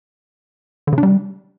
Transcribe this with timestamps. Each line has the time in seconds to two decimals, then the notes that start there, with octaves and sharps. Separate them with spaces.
0.87 D3
0.93 C#3
0.98 D4
1.03 G3